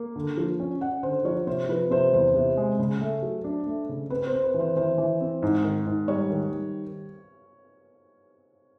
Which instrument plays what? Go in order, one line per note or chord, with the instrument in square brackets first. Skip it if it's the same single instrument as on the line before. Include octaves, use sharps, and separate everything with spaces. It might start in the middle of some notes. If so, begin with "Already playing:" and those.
Already playing: [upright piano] A#3
D3
F3
C#4
[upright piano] C#4 [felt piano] F#5
[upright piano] D3 [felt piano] C5
[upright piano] F3 [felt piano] C#5
[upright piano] C3 [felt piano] C5
[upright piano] F3 [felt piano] B4
[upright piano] C3 [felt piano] C5
[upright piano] E2 [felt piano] C5
[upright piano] C3
G#3
C#3
A3
F#3
D4
A3
C#3
[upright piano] C4 [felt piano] B4
[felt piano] C5
[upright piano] C4
[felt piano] B4
[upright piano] E3
[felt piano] C5
[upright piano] E3 [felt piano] C5
[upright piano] E3
C4
G#2
D#3
G#2
[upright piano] G3 [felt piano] C#5
[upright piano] D#3
G3